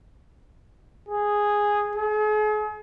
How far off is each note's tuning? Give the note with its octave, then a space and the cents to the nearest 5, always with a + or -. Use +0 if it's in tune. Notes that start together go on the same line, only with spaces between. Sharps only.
G#4 -5
G#4 +40